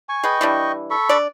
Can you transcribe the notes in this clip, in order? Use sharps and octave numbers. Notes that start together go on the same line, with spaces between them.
G#5 C#6
G#4 B4 D#5 G5 C#6
E3 G3 D4
A4 B5 C#6
D4 D5